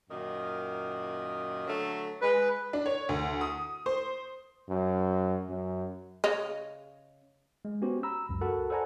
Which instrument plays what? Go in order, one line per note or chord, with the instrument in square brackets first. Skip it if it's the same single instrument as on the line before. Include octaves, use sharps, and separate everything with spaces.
[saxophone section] F#2 A#2 D#3
D3 F#3 A3
[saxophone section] G#3 [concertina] B4
[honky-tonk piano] D4
C#5
D2
D#6
C5
[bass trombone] F#2
F#2
[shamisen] C#3 C#5 D#5
[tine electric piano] G#3
B3 C#4 F#4 G4 C5
A#5 B5 E6
C#2 F#2
F#4 A4 A#4 F#5 A5 B5
A4 C5 D5 F#5 G#5 A#5